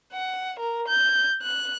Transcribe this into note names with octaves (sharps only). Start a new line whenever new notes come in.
F#5
A#4
G6
F#6